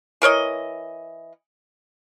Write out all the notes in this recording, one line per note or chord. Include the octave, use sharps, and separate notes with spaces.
E3 A#4 C#5 D#5